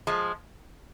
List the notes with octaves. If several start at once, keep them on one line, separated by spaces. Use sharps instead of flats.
F3 G#3